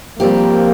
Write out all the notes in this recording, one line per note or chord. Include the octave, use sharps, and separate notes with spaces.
F3 G3 A#3 C4 G4